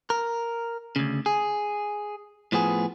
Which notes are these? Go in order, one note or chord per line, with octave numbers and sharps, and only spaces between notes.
A#4
D2 C#3
G#4
A2 F3 B3 G#4